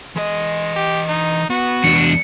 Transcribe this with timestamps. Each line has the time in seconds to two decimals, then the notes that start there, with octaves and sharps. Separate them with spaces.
0.16 E3 G#3 D#5
0.76 G4
1.09 D#4
1.50 B3 F#4
1.84 E2 D4 C#7